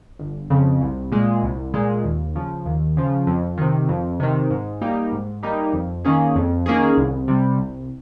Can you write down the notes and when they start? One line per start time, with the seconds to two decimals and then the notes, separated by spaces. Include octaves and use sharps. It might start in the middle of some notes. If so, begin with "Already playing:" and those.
0.19 G1
0.50 F2 C#3
0.81 C2
1.12 A#2 G#3
1.43 C2
1.74 A#2 G#3
2.04 D#2
2.35 C#3 F3
2.65 D#2
2.97 C#3 F3
3.27 F2
3.58 C3 D#3
3.89 F2
4.20 C3 D#3
4.50 G#2
4.81 G3 A#3 D#4 G4
5.12 G#2
5.43 G3 A#3 D#4 G4
5.73 F2
6.04 D#3 A#3 C#4 G#4
6.36 F2
6.66 D#3 A#3 C#4 G#4
6.97 C2
7.28 C3 G3
7.58 C2